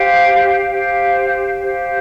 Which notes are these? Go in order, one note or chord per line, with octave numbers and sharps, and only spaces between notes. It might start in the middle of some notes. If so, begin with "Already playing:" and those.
Already playing: G4 C5 F5
G4 C5 F5
G4 C5 F5